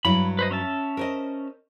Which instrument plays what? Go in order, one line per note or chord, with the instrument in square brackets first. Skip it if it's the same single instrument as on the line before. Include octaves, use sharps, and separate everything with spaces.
[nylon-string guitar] G2 F#3 E4 [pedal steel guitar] B5
[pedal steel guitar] B4 C5 D#5
C#4 E5 A5
[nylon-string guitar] A#4 C5 D#5